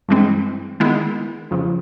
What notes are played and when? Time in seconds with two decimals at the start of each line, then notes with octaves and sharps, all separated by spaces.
0.08 G2 E3 G#3 C4
0.80 D#3 G#3 B3 E4
1.51 F2 C#3 F3